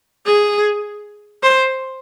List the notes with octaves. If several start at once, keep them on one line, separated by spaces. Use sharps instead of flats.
G#4
C5